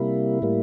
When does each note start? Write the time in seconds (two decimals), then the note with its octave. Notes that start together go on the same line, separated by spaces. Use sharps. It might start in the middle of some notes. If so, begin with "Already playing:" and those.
Already playing: C3 G3 A#3 E4
0.42 A2 G3 A#3